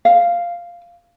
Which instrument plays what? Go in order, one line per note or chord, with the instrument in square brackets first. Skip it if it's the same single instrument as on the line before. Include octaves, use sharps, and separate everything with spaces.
[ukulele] F5